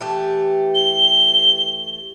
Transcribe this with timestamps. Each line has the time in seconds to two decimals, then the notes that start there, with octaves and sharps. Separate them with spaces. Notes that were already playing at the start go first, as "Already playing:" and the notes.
0.01 E3 A3 G4
0.75 G7